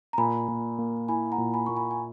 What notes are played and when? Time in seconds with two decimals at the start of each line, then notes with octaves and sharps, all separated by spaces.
0.13 A#5
0.18 A#2 G#5 B5
0.48 A#2
0.79 A#3
1.08 E4 G#5 B5
1.32 F#5 A#5
1.38 A#2
1.54 G#5 B5
1.66 A#2 C#6
1.76 G#5 B5
1.91 G#5